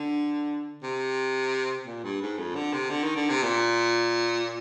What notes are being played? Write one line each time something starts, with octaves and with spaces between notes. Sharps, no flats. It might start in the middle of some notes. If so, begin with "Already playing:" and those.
Already playing: D3
C3
A#2
G2
G#2
F2
D3
C3
D3
D#3
D3
C3
A#2